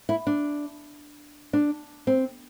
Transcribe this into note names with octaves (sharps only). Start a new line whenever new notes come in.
E4
D4
D4
C4